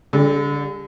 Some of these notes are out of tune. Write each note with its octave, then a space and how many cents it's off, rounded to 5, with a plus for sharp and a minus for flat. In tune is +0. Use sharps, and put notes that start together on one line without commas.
D3 -35 G3 +35